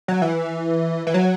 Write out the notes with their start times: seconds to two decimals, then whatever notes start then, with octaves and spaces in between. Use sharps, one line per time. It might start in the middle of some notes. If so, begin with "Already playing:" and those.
0.08 F#3
0.22 E3
1.07 E3
1.14 F#3